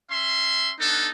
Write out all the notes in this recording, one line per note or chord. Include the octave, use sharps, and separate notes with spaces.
C#4 E5 C6
B3 D4 D#4 A4